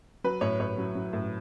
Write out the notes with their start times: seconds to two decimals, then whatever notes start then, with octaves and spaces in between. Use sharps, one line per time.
0.24 F#3 B4
0.41 A2 C#5
0.60 A2 C#5
0.78 F#3
0.95 F#3
1.13 A2